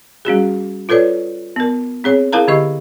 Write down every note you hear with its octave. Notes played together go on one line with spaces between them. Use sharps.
G3 C#4 F#4 G#4
F4 A4 B4 C#5 D5
B3 A#4
C4 G#4 C#5
E4 G#4 A#4 F5 A5 A#5
D3 G4 D#5 C#6